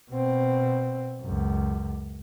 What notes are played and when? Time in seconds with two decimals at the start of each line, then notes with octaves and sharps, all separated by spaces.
0.10 B2 C4
1.22 C#2 F#2